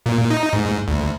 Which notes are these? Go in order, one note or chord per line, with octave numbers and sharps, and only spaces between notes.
A#2
D#4
G#2
D2